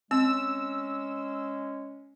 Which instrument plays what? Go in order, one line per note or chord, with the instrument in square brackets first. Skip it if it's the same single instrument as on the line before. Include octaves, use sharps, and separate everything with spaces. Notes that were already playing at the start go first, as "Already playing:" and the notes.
[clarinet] G#3 [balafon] C4 [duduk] C#4 [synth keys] E6